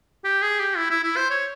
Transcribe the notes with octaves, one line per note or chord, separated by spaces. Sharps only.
G4
G#4
G4
E4
E4
E4
C5
C#5